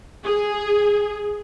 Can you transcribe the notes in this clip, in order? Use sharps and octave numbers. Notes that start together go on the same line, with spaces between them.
G#4